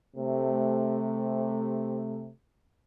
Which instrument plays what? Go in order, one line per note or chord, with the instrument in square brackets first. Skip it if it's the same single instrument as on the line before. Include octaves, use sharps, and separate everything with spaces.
[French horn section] C3 A3